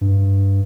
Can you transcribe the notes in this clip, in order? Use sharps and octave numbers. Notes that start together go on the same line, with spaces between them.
G2